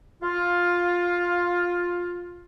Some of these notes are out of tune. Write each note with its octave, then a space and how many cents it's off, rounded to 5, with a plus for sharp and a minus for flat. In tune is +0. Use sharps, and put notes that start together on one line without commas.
F4 +10